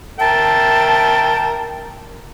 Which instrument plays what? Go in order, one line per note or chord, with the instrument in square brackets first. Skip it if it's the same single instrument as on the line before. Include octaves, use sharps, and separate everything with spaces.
[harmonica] A#4 E5 G5 [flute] A5